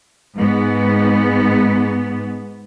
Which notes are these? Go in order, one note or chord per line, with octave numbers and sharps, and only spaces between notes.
G#2 B3